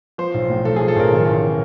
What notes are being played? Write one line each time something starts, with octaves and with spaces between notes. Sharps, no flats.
F3 C5
B1
A2
B1 A4
G#4
F3
A4
B1 A#4
D#3
A1